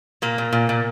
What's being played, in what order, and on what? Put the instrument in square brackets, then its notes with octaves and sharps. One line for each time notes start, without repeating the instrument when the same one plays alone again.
[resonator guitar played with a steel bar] A#2 A#3
A#2
A#2
A#2